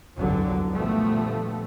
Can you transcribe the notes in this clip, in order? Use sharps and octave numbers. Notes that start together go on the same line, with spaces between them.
G1 C2 F2 G#2 D3 F#3
A#2 D3 F3 G3 A3 B3